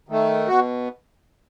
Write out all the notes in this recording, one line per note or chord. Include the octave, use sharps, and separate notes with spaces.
D#3 A3
B2 F#4